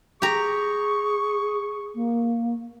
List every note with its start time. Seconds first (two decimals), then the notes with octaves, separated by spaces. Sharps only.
0.22 G4 G#4 A#5 C#6
1.95 A#3